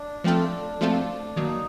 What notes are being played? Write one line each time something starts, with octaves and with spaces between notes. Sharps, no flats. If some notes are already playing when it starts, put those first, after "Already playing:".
Already playing: D4
F3 A3 C4 F4 A4
F3 A3 C4 F4 A4
D#3 F#3 A#3 D#4